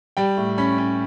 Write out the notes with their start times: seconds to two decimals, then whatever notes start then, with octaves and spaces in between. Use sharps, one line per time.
0.17 G3 G5
0.37 A2
0.58 C#4 B5
0.78 C#4